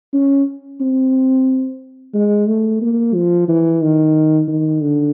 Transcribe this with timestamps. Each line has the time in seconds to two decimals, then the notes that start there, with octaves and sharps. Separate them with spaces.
0.13 C#4
0.81 C4
2.14 G#3
2.47 A3
2.82 A#3
3.14 F3
3.48 E3
3.82 D#3
4.48 D#3
4.81 D3